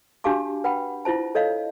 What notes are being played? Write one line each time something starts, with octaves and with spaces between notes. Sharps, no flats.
D4 F#4 G4 F5 A5 D6
B4 F#5 G5 B5
E4 F4 C5 A5
A4 C#5 D#5 F5